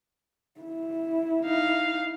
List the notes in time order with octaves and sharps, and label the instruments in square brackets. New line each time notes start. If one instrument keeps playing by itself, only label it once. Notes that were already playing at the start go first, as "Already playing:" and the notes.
[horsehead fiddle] E4
[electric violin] D#4 F5